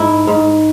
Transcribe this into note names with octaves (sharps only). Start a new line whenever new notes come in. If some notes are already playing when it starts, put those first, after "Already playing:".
Already playing: G#2 E4
G#2